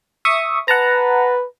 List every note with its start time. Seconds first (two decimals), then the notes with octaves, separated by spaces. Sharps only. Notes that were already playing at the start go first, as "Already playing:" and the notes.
0.25 E5 C#6 D#6
0.68 B4 F#5 A5 A#5